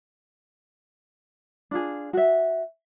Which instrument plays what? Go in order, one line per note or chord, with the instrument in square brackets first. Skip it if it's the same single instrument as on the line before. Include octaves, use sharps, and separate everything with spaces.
[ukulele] D4 F4 G#4
F#4 E5